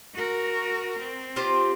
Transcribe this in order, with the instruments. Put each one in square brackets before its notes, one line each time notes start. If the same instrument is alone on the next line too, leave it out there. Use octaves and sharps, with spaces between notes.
[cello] F#4 A#4
C4
[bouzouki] F4 G4 C5